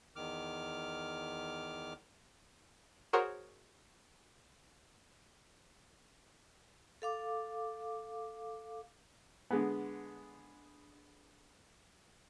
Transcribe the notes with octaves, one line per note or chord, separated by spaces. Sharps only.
E2 D#3 D6 F6
F#4 G#4 A#4 C5 C#5 F#5
A4 F5 D6
D3 G#3 B3